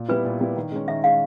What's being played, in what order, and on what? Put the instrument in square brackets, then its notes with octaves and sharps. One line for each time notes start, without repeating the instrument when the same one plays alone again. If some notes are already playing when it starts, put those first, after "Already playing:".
Already playing: [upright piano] A#2
[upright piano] G3 B3 E4 [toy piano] B4
[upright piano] A#2
G3 B3 E4
D#3
G#3 C#4
[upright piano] D#3 [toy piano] E5
[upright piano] G#3 C#4 [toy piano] F5